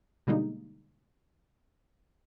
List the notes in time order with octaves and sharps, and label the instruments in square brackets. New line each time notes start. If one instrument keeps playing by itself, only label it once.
[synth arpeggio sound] B2 D3 G3 G#3 A#3 D#4